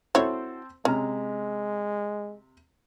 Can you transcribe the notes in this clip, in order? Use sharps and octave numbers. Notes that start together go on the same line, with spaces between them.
C4 E4 F#4 A4 C5 C#5
C3 G#3 C#4 A#5